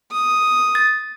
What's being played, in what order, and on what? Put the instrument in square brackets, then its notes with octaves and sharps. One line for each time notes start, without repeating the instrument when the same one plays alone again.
[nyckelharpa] D#6
[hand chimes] A6